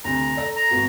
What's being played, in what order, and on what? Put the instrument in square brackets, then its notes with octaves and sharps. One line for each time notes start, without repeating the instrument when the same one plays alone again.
[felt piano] D2 C3 [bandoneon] A#5
[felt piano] A4 D5 A#6
[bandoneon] A#5
[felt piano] G#1 B3 F#4